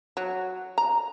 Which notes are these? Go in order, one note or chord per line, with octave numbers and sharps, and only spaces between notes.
F#3
A#5